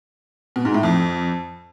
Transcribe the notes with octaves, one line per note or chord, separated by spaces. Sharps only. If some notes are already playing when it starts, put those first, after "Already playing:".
B2
G#2
A2
F2